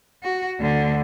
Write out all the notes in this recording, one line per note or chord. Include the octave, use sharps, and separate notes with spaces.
F#4
D2 D3